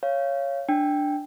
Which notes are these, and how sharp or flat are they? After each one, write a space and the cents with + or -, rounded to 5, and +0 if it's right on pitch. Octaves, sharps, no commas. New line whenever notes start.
C#5 +0 F5 -20
D4 +5 G5 +0